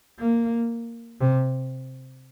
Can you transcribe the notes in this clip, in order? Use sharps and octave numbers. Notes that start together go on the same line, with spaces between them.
A#3
C3